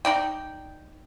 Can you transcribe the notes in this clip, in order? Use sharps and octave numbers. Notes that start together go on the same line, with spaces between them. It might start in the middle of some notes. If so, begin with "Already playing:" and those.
D#4 D5 G5